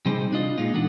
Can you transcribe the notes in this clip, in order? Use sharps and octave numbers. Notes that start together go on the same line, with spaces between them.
C3 G3 D#4 G#4 C5
D4 F4 D#5
A#2 G#3 D#4 F4
E2 D4 A4 F#5